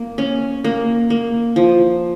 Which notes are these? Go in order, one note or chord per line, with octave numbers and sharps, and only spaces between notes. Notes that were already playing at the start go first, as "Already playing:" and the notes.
Already playing: A#3
C#4
A#3
A#3
F3